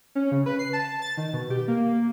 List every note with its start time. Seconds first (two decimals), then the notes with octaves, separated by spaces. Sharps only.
0.15 C#4
0.32 C#3
0.46 B4
0.59 C7
0.73 A5
1.02 A6
1.17 D#3
1.33 B2
1.50 G4
1.68 A#3